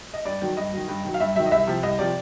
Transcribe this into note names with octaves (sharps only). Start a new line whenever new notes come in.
D#5
G2 D5
D#3 F#3
G2 D#5
D#3 F#3
G2
D#3 F#3
F5
G2 E5
D#3 F#3 E5
D#5
C2 E5
C3 F3
C2 D#5
C3 F3 D5